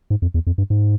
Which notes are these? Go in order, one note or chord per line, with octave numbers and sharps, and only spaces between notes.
G#2
F2
E2
F2
G2
G#2